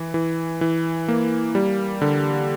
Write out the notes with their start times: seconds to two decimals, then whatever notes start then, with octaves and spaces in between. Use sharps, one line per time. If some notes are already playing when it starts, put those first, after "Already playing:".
Already playing: E3
0.14 E3
0.61 E3
1.08 A#3
1.55 G3
2.02 D3